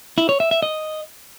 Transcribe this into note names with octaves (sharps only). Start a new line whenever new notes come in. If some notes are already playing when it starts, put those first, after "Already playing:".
E4
C#5
E5
E5
D#5